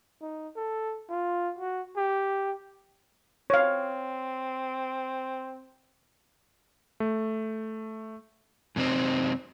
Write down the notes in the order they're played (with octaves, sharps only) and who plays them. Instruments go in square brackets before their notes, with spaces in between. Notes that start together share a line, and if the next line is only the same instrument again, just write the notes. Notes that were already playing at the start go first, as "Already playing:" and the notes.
[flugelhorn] D#4
A4
F4
F#4
G4
[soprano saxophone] C4 [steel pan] C#5 F5
[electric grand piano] A3
[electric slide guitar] F#2 C3 B3 C4 D#4